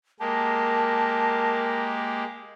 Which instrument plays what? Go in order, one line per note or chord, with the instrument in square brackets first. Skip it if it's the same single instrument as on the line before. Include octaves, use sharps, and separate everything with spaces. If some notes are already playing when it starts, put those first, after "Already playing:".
[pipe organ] G#3 A#3 G4 [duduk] A#4 [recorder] A5